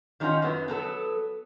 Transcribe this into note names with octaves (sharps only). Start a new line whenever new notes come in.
D#3 G3 C#4 D#4 F4 F#5
F#2 F#3 B3
F#3 B3 A4